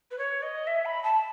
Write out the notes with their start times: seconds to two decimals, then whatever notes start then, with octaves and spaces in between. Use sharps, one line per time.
0.11 B4
0.18 C#5
0.42 D#5
0.67 E5
0.85 B5
1.04 A5